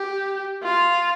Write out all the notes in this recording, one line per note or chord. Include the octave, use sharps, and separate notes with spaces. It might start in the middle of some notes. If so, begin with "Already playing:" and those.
Already playing: G4
F4